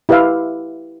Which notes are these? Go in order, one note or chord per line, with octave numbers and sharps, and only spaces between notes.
E4 G4 B4 E5 F5